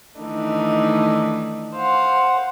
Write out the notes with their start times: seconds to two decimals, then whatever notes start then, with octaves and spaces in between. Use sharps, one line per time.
0.18 D#3 E3 A3 D4 D#4
1.74 C5 F5 F#5